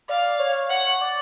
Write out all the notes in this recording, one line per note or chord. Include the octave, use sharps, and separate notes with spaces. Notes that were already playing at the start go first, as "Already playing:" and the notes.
D5 F5
C#5
C#5 F#5
D5